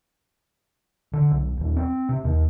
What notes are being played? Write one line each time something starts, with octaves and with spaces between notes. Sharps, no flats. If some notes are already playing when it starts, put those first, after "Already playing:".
D3
B1
D#1
C4
C3
D#2